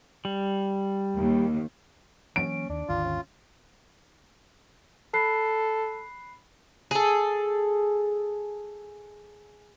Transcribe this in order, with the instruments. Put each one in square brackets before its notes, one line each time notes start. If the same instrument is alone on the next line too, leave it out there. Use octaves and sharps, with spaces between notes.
[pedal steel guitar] G3
[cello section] D#2
[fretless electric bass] E3 F#3 A#3 [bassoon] C#4 [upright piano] D7
[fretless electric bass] D#2 [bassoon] D4
[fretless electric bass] G#1 D#2 D3 [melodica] F4
[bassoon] C#4
[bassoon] A4 [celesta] B5 F#6 C7
[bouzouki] G#4 A4